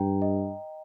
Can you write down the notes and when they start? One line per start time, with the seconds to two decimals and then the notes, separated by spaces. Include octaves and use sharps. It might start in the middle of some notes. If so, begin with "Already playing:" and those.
Already playing: G2 G5 A#5
0.22 D#5